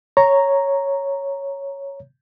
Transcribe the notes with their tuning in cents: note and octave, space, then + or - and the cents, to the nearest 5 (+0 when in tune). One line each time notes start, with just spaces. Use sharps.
C#5 +0 A#5 +0